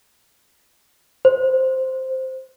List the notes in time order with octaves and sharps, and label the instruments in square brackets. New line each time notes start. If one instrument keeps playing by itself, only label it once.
[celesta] C5